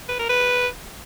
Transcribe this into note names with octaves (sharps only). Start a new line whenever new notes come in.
B4
A#4
B4